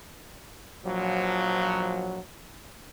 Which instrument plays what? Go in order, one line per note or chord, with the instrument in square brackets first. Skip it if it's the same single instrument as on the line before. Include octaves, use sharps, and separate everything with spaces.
[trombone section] A#1 F3 F#3